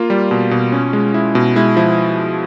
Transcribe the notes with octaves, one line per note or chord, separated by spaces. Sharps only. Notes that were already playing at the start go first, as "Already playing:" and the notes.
Already playing: A#3 F4
G3
B2
B2
C#4
G#3
E4
B2
G#3 E4
F3 E4